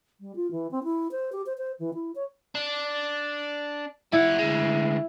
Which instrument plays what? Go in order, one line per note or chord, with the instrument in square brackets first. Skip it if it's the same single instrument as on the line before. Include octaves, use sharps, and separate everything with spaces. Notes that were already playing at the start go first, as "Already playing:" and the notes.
[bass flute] G3
F4
E3
C4
E4
C5
G4
C5
C5
E3
E4
C#5
[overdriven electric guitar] D4
[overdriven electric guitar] G3 F#5 [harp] E4
[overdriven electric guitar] D2 G#3